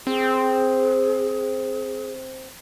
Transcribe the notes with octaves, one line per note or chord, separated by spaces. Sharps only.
C4 G#4